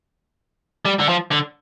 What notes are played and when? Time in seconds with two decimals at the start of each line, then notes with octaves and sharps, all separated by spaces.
0.85 G3
0.99 D3
1.09 F3
1.31 D3